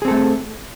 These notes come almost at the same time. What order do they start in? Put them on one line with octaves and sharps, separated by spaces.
G#4 C4 A4 A3